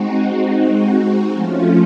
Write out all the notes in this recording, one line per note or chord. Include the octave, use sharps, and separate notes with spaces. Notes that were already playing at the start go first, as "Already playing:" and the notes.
Already playing: G#3 C4 D#4 F#4
F3 A3 C#4 F4